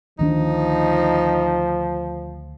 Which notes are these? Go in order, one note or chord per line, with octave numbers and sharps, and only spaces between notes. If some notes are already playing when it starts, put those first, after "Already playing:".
D2 D#3 F3 D4 D#4